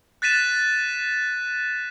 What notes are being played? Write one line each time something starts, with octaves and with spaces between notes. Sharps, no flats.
F#6 A6 B6 D#7 E7